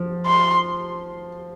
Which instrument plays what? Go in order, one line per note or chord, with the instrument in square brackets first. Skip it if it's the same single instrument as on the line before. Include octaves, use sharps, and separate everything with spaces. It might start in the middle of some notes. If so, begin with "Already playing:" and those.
Already playing: [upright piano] F3
[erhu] C6